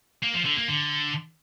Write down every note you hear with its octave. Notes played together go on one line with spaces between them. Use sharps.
A#3
F3
D3
A#3
D3